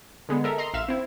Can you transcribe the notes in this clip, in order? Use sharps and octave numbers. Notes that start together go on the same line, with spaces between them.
D3 G#3 B3
A4 A#4 E5
D#5 A#5 C6
A1 E5 F5 E7
C4 E4